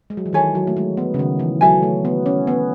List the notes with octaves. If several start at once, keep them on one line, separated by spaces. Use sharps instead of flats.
G#3
F#3
E3
D#3 A4 C#5 E5 G#5
F#3
A3
G#3
B3
C#3
D#3
E3
F#3 A4 E5 G#5
A3
B3
C#4
B3